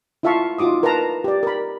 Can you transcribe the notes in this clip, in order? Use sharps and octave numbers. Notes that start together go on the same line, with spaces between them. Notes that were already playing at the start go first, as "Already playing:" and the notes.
E4 F4 E5 F5 A5 C#6
D#4 F4 F#4 D6 D#6
A#4 B4 F5 A5 A#5
G4 D5
A#4 B5